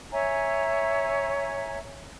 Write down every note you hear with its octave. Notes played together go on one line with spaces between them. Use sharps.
C#5 E5 G#5 A#5